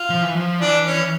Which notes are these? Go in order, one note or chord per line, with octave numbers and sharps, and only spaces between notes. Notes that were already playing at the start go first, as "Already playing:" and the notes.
Already playing: F4
F3
E3
F3
E3 D4
C#4